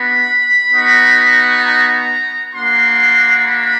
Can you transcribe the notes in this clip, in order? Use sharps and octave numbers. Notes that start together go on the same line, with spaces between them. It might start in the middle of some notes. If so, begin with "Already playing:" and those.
Already playing: B3 D4 F#4 B5
B3 D#4 F#4
A#5
A#3 D4 F#4 C6
B5